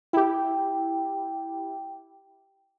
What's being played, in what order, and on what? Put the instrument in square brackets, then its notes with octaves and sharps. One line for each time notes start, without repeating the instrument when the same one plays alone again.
[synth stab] E4 G4 [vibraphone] G5